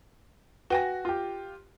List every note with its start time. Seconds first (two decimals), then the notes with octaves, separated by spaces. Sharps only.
0.70 F#4 B4 G5 G#5 A#6
1.05 F4 G4